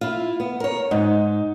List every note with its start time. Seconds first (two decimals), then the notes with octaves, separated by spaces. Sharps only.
0.01 E4 F4
0.40 B3
0.60 A#4 C#5
0.91 G#2 D#4